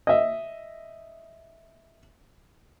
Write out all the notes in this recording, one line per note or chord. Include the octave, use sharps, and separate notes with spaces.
D#5 E5